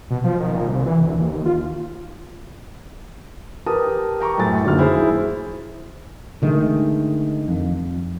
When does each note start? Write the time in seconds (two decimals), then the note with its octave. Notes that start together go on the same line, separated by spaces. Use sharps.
0.10 B2
0.24 F3
0.40 D#3
0.53 A#2
0.67 C2
0.86 E3
1.03 D2
1.18 D#2
1.32 D#2
1.46 F4
3.66 G4 A#4 B4 A5 D#6
4.20 G5 A#5 C#6 D6
4.38 F#2 A2 A6
4.63 F#1 D#2 D3 F3 F#3 F6
4.79 E4 G#4 C5
6.42 D3 D#3 G#3 A3
7.48 F2